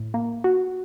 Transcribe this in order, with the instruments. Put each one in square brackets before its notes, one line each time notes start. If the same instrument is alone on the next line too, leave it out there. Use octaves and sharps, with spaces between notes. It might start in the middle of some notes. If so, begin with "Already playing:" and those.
Already playing: [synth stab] A2
A#3
F#4